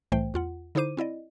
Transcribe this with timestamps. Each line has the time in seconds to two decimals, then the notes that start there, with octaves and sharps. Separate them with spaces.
0.12 C2 A2 E3 A3 C5 G5
0.34 E2 F4 F#5
0.75 D3 D#4 E4 C5 D6 D#7
0.97 C4 E4 D5 D#5